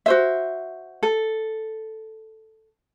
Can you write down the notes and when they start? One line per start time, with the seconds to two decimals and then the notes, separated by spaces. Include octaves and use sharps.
0.06 F#4 C5 E5
1.03 A4